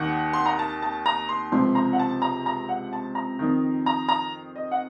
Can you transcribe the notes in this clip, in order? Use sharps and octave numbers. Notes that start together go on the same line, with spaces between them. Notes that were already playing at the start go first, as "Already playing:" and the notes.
Already playing: D#2 D#3 F#5
C6
A#5
A5
A5
A#5
C6
C#2 C3 F3 C6
A#5
F#5
A5
A#5
A#5
F#5
A5
A#5
F2 D#3
A#5
A#5
D#5
F#5